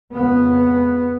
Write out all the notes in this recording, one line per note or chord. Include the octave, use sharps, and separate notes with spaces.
F2 C#3 B3